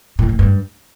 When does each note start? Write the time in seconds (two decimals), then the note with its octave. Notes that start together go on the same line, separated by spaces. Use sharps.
0.19 A2
0.29 A2
0.39 G2